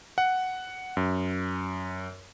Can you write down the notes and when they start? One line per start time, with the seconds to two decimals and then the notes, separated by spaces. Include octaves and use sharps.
0.18 F#5
0.97 F#2